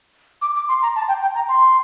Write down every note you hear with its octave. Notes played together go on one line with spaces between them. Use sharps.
D6
D6
C6
A#5
A5
G5
G5
A#5
C6